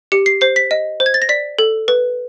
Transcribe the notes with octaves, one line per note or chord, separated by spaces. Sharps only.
G4 C#7
C7
C5 C7
B6
D#5
C5
G#6
A6
A#6
D5 B6
A4
B4